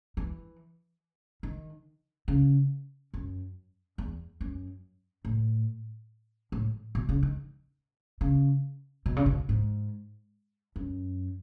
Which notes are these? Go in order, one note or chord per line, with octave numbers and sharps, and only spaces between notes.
E3
D#3
C#3
F#2
E2
F#2
A2
A2
B2
C#3
D#3
C#3
B2
C#3
B2
G#2
F#2